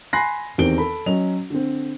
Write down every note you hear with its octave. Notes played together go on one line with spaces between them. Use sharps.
G#5 B5 C6 F#6 A#6 C7
E2 D#3 C4 G4 D7 G7
A4 B5
F#3 C#4 D#5 F7
D3 C4